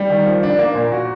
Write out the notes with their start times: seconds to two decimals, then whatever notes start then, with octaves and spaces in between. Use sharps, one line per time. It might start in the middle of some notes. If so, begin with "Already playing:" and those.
Already playing: G3
0.10 D#3
0.26 F3
0.43 D4
0.58 A#3
0.75 A#2
0.92 F#4